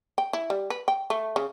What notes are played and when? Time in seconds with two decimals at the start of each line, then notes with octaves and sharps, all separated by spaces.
0.18 G5
0.33 E4
0.50 G3
0.70 B4
0.88 G5
1.10 A3
1.36 C#3